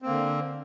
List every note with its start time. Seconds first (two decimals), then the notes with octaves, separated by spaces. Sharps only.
0.02 C4
0.05 A#3
0.09 D3